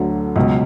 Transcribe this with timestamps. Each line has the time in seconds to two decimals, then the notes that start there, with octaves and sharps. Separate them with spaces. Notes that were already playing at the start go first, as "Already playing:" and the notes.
Already playing: D2 D3 F#3
0.36 C#2 B2 F#3